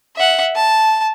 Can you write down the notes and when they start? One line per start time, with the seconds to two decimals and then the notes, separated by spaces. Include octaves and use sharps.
0.16 E5 F#5
0.56 A5